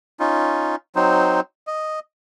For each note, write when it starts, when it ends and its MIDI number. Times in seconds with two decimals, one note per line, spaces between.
0.20 0.76 61
0.20 0.76 63
0.20 0.76 65
0.96 1.41 54
0.96 1.41 60
0.96 1.41 63
0.96 1.41 72
1.67 2.00 75